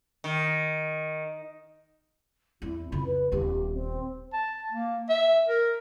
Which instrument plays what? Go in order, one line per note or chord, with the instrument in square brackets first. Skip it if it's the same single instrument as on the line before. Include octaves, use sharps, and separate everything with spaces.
[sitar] D#3
[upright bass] E2 C4 [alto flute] E4
[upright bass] F2 C#3 [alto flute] B5
[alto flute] B4
[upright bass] D#1 B3 [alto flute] G4
[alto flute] C4
[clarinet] A5
A#3
E5
A#4